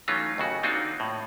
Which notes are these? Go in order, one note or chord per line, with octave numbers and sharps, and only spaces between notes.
E3 F#3 A3 C#4 D#4 F4
D#2 C#3 F#4
A#3 C4 D4 D#4 F4 F#4
A2